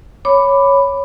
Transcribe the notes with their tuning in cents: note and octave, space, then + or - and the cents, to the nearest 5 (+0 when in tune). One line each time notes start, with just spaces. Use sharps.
C#5 +0 B5 +5 D6 +0